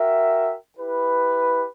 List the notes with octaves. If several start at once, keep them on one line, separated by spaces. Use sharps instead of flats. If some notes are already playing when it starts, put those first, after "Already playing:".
Already playing: F#4 A#4 E5 G5
E4 G4 B4